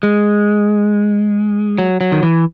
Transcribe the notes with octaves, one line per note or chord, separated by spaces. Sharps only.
G#3
F#3
F#3
D#3
E3